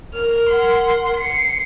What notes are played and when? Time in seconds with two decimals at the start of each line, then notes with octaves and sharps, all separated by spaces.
0.14 A#4 F6
0.49 F#5 C6
1.16 C7 C#7